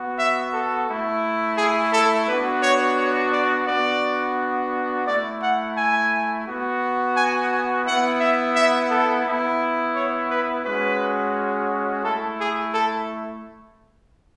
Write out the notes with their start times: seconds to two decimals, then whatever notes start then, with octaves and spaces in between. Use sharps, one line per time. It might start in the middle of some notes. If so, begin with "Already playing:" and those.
Already playing: B3 F#4
0.19 E5
0.54 A4
0.89 A3 E4
1.58 G#4
1.93 A4
2.28 B3 D4 F#4 B4
2.63 C#5
2.98 C#5
3.32 D5
3.67 B3 D4 F#4 D5
5.07 A3 E4 D5
5.42 F#5
5.77 G#5
6.47 B3 F#4
7.16 G#5
7.51 G#5
7.86 B3 E4 F#5
8.21 E5
8.56 E5
8.91 A4
9.26 B3 E4
9.95 C#5
10.30 B4
10.65 G#3 C#4 F#4 B4
12.04 A3 E4 A4
12.40 G#4
12.75 A4